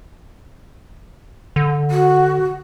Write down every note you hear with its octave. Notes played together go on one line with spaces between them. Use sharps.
D3
F#4